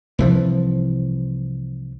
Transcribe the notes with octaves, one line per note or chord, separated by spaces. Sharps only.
C2 E3 F3